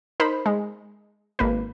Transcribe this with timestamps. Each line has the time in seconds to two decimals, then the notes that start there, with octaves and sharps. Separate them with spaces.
0.20 D#4 A#4 C5 B5
0.46 G#3
1.39 G#1 A#3 B4